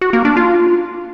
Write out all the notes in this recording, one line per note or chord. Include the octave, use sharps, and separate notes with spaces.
F#4
A#3
D4
F4